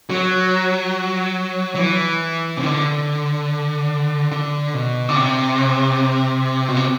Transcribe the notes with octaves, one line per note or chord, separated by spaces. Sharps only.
F#3
F#3
E3
C3
D3
D3
B2
D3
C3
B2
C3